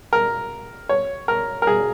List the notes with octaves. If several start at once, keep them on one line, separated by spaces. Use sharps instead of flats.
A#4
C#5
A#4
A#4
G#4